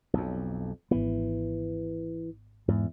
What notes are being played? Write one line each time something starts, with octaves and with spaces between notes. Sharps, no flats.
B1 F2
G#1 E3 B3
E2 G#2